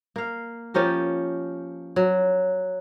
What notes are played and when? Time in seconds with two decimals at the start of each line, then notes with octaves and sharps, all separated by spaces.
0.16 A#3 F5
0.74 F3 C#4 G4 A#4
1.96 F#3